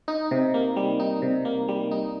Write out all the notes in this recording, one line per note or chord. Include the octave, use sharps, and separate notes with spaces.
D#4
C3
A#3
G3
D#4
C3
A#3
G3
D#4